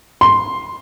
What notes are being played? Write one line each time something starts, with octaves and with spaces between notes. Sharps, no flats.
C6